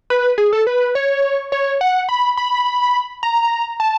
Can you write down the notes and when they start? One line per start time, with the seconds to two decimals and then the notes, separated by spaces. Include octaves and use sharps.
0.10 B4
0.38 G#4
0.53 A4
0.67 B4
0.95 C#5
1.52 C#5
1.81 F#5
2.09 B5
2.37 B5
3.23 A#5
3.80 A5